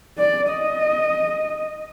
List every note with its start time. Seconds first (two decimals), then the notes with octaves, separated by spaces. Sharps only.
0.18 D5
0.50 D#5